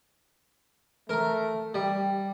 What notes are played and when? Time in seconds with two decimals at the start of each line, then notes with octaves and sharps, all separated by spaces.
1.09 A3 A#4 A#5
1.74 G3 G4